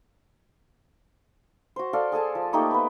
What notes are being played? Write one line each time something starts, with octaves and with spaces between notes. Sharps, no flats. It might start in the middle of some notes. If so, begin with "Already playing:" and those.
F#4 C5
A4 D5 F5
G#4 A4 G#5 A5
F3
A3 A#3 D#4 G4
B3 B4